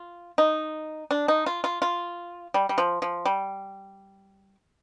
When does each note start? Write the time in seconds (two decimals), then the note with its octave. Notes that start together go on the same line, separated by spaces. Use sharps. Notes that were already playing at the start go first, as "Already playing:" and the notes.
Already playing: F4
0.38 D#4
1.11 D4
1.28 D#4
1.46 F4
1.64 F4
1.82 F4
2.54 G3
2.69 G3
2.78 F3
3.02 F3
3.25 G3